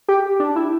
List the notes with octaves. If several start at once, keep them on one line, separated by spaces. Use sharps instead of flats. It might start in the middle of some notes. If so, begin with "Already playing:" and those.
G4
D4
E4